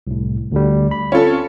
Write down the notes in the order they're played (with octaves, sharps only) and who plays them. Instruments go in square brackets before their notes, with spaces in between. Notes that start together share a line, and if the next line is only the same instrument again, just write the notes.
[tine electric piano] C2 A2
D2 D3 G3
B5
[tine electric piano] C4 [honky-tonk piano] C#4 F4 A4